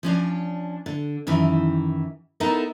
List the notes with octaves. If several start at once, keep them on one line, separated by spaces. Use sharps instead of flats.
F3 C#4 D4
D3
F#2 D#3 E3 E4
B3 D#4 E4 A4 A#4